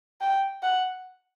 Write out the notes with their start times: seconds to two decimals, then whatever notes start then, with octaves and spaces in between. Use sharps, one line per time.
0.21 G5
0.63 F#5